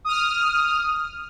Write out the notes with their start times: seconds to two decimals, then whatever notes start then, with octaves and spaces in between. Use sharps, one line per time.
0.05 D#6 F6